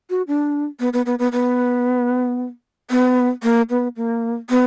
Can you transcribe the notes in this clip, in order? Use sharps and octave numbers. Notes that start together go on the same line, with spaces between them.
F#4
D4
B3
B3
B3
B3
B3
B3
A#3
B3
A#3
B3